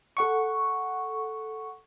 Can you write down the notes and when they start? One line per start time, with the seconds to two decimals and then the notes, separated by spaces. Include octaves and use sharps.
0.17 A4 F#5 C#6